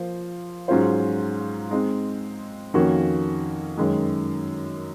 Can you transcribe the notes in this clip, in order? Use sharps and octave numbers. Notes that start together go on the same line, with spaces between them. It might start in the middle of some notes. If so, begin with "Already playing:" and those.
Already playing: F3 A#3 F4 C5
G#2 F#3 C#4 F4 C5
G#3 C4 D#4
F2 D#3 A#3 C#4 F#4
F#2 D#3 G#3